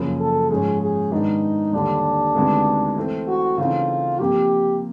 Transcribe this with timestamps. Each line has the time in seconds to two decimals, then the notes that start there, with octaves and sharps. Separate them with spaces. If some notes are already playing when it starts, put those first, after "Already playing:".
Already playing: F#2 C#3 F3 A#3
0.20 A4
0.50 G#2 F3 G#3 C#4 G#4
0.81 G#4
1.11 G#2 D#3 G#3 B3 D4 D#4
1.73 D#2 D3 G3 D4
2.35 D2 C3 D#3 G#3 B3
2.96 E3 A3 C4
3.28 F#4
3.58 C#3 E3 A3 C4 D#4 F4
4.20 C3 F3 A#3 G4